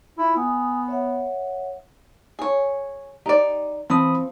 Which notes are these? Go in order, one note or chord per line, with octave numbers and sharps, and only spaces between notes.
E4 F4 E5
B3 G#5 D#6
C#5 E5 F#5
G#4 C#5
D#4 G4 D5
E3 F3 C4 B5 D#6